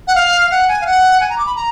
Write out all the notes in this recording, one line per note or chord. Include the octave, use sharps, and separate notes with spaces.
F#5
F5
F#5
G#5
F5
F#5
G#5
A#5
D6
B5
A#5